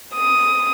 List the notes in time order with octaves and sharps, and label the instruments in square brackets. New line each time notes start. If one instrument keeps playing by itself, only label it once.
[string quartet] D#6